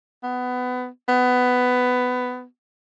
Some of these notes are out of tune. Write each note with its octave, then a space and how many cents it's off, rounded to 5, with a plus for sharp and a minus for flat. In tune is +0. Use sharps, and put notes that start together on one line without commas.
B3 +20
B3 +15